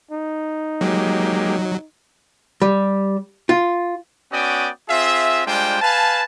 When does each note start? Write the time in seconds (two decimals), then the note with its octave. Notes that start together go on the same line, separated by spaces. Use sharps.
0.11 D#4
0.81 F#3 G#3 A#3 G4
2.62 G3
3.49 F4
4.32 B3 C#4 F#4 D5 G5 D#6
4.89 C4 F4 G#4 E5
5.46 G3 G#3 D4 F4 C5 G5
5.81 B4 F5 G#5 A5